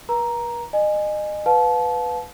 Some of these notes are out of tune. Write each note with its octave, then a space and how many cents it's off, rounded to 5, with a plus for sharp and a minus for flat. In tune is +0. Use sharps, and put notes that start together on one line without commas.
B4 -45 A#5 +5
D#5 -30 G#5 +0
B4 +5 F5 +30 A5 -25